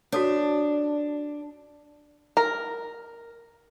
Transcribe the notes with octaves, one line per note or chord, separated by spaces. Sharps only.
D4 F#4 A4 C#5
A#4